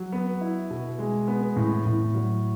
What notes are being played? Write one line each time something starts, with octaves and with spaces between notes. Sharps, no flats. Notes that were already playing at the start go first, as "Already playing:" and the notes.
Already playing: F#3
B3
E4
B2
G#3
B3
A2
A2
F#3